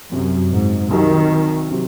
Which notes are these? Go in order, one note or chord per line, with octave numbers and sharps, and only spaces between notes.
C2 F#2 C3 F#3
G#2
C2 C3 D#3 F#3
C3 F#3